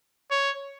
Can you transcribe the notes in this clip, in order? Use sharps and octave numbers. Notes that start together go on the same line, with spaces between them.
C#5